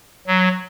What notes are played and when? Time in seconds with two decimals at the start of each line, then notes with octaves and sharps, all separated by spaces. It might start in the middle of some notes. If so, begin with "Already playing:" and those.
0.27 F#3